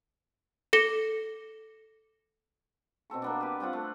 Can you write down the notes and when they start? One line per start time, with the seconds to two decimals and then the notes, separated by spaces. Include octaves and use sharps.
0.73 A4 D6 A#6 C#7 G7
3.10 B2 C4 A4 C#6
3.22 A#3 B3 D4
3.41 G4 B4
3.60 G3 C4 F4 F#5
3.73 A3